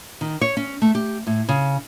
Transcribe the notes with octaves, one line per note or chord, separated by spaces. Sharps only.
D#3
C#5
C#4
A3
G4
A2
C#3